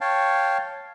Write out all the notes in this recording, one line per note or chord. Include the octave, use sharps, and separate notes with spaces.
C#5 F5 G5 A5